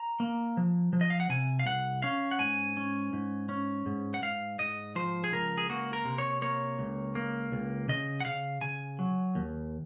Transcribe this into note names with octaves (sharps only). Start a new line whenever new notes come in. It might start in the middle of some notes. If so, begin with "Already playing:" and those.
Already playing: A#5
A#3
F3
F3
D#5
F5
F#5
C3 G#5
F5
C2 F#5
C#4 F5
F#5
G#2 G#5
C#4
G#2
C#4
G#2
F#5
G#2 F5
G#2 D#5
F3 C5
G#4
C#2 A#4
G#4
A#3 F#4
A#4
C3
C#5
A#3 C#5
C#2
A#3
C#2
C#3 D#5
F#5
C#3 F5
C#3 G#5
F#3
D#2